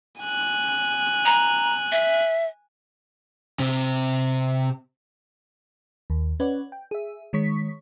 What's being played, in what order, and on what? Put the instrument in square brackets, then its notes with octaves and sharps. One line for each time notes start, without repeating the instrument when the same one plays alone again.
[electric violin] G#5 F#6
[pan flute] A#5
E5
[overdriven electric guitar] C3 C4
[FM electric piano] D#2
C#4 B4 C#5 D5 F#5
G5
G#4 E5
D#3 G#3 C#5 C#6 B6